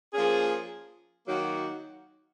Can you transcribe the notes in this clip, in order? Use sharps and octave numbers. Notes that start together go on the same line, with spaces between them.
F3 A#3 C#4 G#4
D#3 F#3 A#3 D#4 F#4